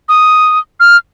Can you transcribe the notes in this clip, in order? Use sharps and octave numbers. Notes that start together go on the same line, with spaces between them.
D#6
F6